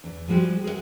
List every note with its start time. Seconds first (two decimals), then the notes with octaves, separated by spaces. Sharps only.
0.04 E2
0.28 F3 G3 G#3 F#4 G4
0.64 G#4 A#4 C#5 F#5